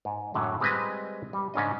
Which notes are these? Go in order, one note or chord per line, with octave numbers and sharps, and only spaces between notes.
G#2
F#2 A2 D3 F#3
G3 G#3 C4 F4 B4 D#5
G3
G#2 C#3 C#4 D4 D#5